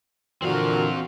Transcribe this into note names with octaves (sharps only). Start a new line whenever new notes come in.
A#2 D3 E3 C4 F#4 F5